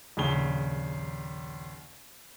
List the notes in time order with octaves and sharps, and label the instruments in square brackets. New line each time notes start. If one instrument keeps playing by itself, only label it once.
[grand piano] A#1 D#2 C#3 G7